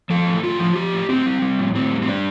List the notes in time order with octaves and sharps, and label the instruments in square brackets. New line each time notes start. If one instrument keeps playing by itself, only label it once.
[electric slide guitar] F3 A4
A2
A2 F4
F3
F3 G4
A2
A2 C4
G3
G3
A2
A2 C4
G3
C4
G3 D4